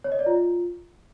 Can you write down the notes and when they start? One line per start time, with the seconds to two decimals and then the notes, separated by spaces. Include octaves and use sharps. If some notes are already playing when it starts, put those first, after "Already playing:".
0.04 C#5
0.12 D#5
0.19 D5
0.26 F4